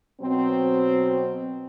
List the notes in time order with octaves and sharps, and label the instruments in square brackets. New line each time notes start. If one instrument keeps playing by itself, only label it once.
[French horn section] B2 F#3 C4